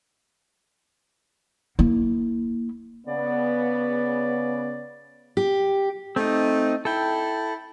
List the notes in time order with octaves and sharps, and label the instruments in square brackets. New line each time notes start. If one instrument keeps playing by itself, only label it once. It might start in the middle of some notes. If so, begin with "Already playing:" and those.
[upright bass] A#3 E4
[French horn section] C#3 B3 [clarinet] D5
[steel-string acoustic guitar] G4
[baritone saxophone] A3 [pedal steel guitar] C4 D#4
[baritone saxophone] E4 [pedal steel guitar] A4 G5